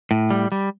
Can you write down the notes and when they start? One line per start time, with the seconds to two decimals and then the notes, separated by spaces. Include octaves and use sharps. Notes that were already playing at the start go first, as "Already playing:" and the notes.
0.11 A2
0.30 G3
0.52 G3